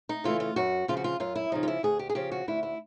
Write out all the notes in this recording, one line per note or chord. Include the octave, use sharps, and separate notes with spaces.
D#4
C#3 E3 A3 F4
F4
F#2 F#4
C#3 F3 F4
F#4
F4
F#2 F4
E4
C#3 F3 D#4
F4
E4
D2 G#4
G4
G#4
C#3 F3 G4
F#4
D2 E4
E4